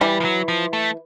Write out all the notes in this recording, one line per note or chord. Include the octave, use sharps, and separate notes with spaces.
E3 G3
F3
F#3
F3
A3